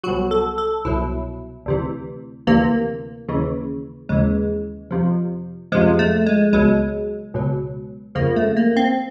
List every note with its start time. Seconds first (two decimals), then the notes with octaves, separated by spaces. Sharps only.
0.03 C2 B2 F#3 F#4
0.31 A4
0.58 A4
0.85 C2 B2 F#3 E4
1.66 D2 C3 E3
2.47 D2 C3 E3 A#3
3.29 D#2 C#3 E3
4.09 D#2 C#3 E3 G#3
4.91 F2 C3 F3
5.72 F2 C3 F3 G#3
5.99 A3
6.26 G#3
6.53 C#2 B2 F#3 G#3
7.34 C#2 B2 F#3
8.15 F2 C#3 F3 A#3
8.36 A3
8.57 A#3
8.77 C4